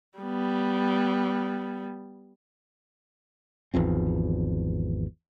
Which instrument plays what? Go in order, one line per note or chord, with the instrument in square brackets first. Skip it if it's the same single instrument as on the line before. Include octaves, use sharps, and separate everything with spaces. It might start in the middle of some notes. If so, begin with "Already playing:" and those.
[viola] G3 B3
[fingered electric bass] G#1 E2 F3 C4